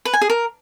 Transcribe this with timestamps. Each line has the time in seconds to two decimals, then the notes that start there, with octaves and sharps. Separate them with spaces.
0.05 B4
0.13 G#5
0.22 G#4
0.30 A#4